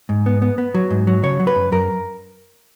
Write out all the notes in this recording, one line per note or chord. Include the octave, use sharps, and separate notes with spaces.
G#2
B3
B3
B3
F#3
G#2
F#3
C#3 C#5
F#3
B4
F#2
F#2 A#4